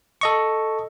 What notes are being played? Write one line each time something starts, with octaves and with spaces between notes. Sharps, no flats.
A4 D#5 C#6